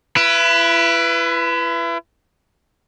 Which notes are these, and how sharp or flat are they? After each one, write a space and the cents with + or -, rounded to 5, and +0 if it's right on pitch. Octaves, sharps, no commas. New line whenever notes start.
E4 +35 B4 +0